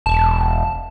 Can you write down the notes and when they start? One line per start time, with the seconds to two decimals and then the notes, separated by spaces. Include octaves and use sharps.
0.06 E1 A5